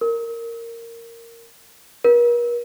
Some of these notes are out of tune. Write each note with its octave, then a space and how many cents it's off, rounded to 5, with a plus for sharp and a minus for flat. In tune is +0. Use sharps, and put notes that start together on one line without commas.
A#4 -10
A#4 +45